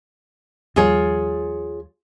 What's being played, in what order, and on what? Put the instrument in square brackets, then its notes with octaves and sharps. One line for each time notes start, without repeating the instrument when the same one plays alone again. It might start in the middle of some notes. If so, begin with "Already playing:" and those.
[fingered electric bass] D#2 F3 G3 [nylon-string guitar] F4 G#4 C#5